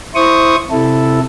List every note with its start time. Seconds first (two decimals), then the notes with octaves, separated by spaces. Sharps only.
0.15 E4 C5 C#6 D#6
0.71 C3 E4 A4